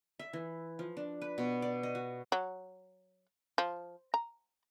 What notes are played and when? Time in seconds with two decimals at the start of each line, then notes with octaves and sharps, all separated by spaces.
0.19 E5
0.33 E3
0.79 F3
0.97 D4
1.22 B4
1.38 B2
1.62 D5
1.83 D#5
1.95 F#4
2.32 F#3
3.58 F3
4.14 A#5